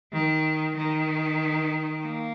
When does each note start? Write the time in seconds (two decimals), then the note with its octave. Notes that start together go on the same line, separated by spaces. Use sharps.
0.13 D#3
0.76 D#3
2.04 A#3